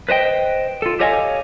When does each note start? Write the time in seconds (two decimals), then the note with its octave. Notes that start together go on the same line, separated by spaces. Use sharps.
0.09 B4 C5 D#5 G5
0.82 F4 A4
1.00 G4 A4 C#5 D#5 F5 G#5